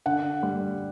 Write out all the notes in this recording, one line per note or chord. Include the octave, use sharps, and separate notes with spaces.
D3 F#5
G3